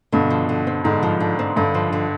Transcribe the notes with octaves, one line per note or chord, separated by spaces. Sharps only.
G2 B2 D3
F3
D3
C4
G#2 D3
F3
D3
C4
G2 D3
F3
D3